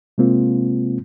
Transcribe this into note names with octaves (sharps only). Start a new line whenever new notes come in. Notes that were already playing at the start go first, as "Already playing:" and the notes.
C3 G#3 A#3 C4 F4